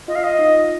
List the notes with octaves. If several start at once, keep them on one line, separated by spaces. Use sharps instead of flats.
F4 D#5
F5
D#5
D#4